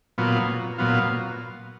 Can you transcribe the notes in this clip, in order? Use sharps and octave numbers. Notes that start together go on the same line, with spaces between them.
A#2 F#3 B3 F4
A#2 F#3 B3 F4